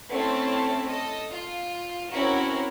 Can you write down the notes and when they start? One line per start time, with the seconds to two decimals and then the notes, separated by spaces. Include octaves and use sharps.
0.11 A3 C4 C#4 E4 A4 A5
0.87 A4 D#5
1.31 F4
2.12 C4 C#4 E4 F#4 A#4